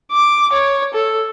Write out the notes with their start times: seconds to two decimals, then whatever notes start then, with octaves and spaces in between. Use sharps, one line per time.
0.12 D6
0.52 C#5
0.94 A4